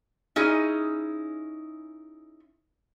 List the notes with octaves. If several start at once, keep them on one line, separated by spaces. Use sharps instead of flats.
C#4 D#4 E4 G#4